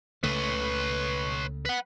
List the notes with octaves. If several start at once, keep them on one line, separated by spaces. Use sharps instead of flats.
C#2 C#3 A3 B4 C#5
B4 F#5